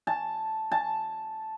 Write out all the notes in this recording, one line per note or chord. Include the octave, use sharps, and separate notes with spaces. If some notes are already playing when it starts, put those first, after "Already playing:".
A5
A5